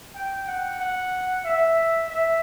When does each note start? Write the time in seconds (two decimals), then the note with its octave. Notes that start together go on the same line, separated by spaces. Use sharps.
0.15 G5
0.47 F#5
0.80 F#5
1.45 E5
2.09 E5